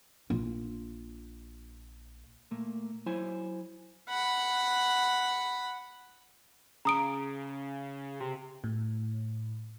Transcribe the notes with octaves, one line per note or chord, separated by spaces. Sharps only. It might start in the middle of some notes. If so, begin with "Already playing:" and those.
A#1 F4
A#2 A3 A#3
F#3 E4 C5 G#5
F#5 B5
C#3 A#5 D#6 D7
C3
A2